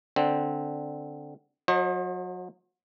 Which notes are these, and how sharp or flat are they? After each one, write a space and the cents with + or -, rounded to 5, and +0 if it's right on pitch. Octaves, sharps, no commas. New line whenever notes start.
D3 +0 C4 +0
F#3 -30 C5 +40 D#5 +0